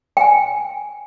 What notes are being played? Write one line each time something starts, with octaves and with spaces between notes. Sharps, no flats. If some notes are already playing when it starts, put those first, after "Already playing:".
G5 G#5